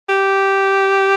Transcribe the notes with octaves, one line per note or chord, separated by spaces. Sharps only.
G4